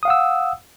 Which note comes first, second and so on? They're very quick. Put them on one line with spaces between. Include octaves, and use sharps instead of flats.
D#6 F5 F#5 E6